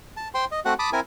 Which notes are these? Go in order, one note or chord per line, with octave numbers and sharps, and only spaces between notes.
A5
C5 G5 C6
D#5
A3 C4 F#4 F#5
A5 B5 D6 D#6
C4 E4 A#4 G#5